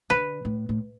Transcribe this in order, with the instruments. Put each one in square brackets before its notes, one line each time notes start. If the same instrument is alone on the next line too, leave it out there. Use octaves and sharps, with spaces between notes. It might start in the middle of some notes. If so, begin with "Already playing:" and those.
[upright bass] D3 [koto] B4
[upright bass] A2
A2